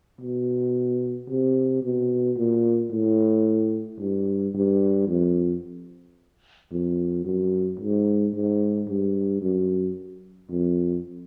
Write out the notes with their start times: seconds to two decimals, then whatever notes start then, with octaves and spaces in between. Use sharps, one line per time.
0.21 B2
1.29 C3
1.83 B2
2.38 A#2
2.91 A2
4.00 G2
4.55 G2
5.08 F2
6.71 F2
7.25 F#2
7.79 G#2
8.34 G#2
8.88 G2
9.42 F#2
10.51 F2